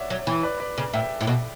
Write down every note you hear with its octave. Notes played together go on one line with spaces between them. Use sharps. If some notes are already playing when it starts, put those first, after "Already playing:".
Already playing: C#5 D5 E5 F#5
F#3
E3
B4 D5
B4 D5
C#3
A2 E5 G5
A2
B2